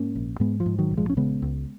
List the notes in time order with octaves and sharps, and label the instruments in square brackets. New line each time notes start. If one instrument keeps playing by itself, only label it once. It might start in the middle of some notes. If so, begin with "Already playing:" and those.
Already playing: [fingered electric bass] G#2 A#3 C#4
A#1
G#2 G#3 B3
F3
G#2
D#3 F#3
A#1
F3 G#3
C#4
C#3 G#3 B3
C#2